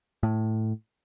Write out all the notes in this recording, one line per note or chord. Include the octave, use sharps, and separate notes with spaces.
A2